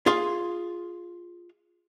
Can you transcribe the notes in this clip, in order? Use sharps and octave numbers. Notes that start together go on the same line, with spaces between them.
F4 G#4 F5 C6